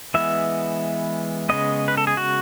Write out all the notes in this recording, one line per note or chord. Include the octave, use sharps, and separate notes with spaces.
E3 G#3 B3 E5
C#3 G#3 B3 D#5
B4
A4
G#4
F#4